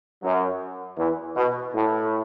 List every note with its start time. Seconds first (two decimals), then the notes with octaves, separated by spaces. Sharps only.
0.23 F#2 F#3
0.98 E2 E3
1.36 B2
1.75 A2